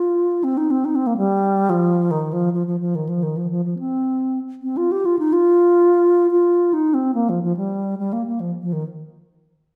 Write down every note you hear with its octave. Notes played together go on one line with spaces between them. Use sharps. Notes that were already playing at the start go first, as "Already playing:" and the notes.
Already playing: F4
C4
D#4
C4
D#4
C4
A#3
G3
F3
D#3
F3
F3
F3
F3
D#3
F3
D#3
F3
F3
F3
C4
C4
F4
G4
F4
D#4
F4
F4
D#4
C4
A#3
F3
F3
G3
G3
A#3
A#3
F3
F3
D#3